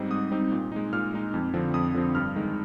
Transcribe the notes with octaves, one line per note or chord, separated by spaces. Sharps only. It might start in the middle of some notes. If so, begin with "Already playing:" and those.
Already playing: G#2 G3 C4 D#4
G#2 D#6
G3 C4 D#4
A#2
G#3 D#4
A#2 F6
G#3 D#4
F2
D3 F3 C4
F2 D#6
D3 F3 C4
G2 F6
D#3 G#3 D#4